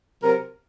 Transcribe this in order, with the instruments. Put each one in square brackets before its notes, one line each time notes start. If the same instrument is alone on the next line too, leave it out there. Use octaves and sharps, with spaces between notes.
[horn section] C3 F#3 A#4